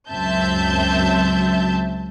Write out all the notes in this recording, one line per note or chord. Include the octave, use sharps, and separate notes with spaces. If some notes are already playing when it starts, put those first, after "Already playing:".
C#2 F#2 C4 E5 A5 G6